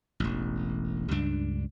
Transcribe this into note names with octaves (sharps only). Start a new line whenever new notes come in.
E1 A1
C#2 G2 D4